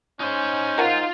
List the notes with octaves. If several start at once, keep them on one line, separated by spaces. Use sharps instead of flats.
C#4 D#4 C5
F4 A#4 F#5 G#5